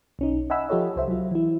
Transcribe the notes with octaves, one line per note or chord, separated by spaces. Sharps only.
B1 C#4 D#4
D#5 E5 F#5 G#5 B5 E6
F3 F4 G4 A4 C#5 D#5
C2 C5 E5
F#3 F4
E3 E4